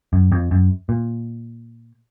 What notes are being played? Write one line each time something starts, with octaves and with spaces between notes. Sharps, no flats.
F#2
F2
F#2
A#2